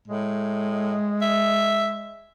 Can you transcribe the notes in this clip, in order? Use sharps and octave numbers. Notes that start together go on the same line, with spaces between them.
A2 G#3
E5